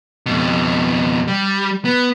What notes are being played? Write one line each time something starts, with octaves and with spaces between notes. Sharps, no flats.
F2 B2
G3
B3